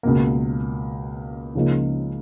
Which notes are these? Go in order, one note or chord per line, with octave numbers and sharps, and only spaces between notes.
C#2 B2 A#3
C#2 C#3 F3 A#3 D#4